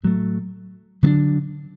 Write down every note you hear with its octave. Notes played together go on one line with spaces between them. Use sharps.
A2 F#3 A3
D3 F#3 B3 D4